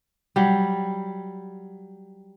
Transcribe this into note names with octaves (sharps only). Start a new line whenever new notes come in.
F#3 G3